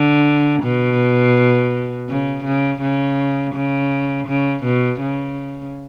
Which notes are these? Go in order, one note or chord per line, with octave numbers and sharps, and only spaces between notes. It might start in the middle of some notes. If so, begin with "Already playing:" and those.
Already playing: D3
B2
C#3
C#3
C#3
C#3
C#3
B2
C#3